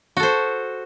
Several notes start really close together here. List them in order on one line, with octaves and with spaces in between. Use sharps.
F#4 A4 C5